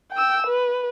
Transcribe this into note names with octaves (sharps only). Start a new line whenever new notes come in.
G5 E6
B4